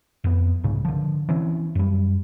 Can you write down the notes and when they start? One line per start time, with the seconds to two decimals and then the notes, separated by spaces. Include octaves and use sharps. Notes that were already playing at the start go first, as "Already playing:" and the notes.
0.24 F2 B3
0.64 C2 G#2 C#3
0.85 D3 F3
1.29 E3 C4 C#4
1.75 F#2 G3